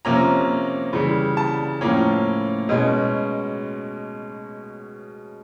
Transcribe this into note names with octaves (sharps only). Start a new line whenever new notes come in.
C3 F3 A#3 C#4 A#5
C#3 E3 G3
A5
A2 F3 A#3 C#4
B2 G#3 C#4